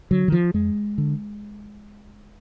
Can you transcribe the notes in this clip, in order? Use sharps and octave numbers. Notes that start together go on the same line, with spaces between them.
D3 F#3
D#3
F3
F2 G#3
D3